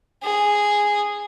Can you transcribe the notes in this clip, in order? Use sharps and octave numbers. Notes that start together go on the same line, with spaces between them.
G#4